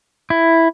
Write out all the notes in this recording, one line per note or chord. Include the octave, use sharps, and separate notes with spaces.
E4